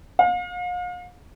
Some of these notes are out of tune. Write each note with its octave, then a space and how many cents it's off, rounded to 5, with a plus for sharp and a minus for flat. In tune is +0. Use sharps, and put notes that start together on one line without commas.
F5 +40